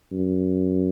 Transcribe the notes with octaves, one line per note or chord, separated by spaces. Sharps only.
F#2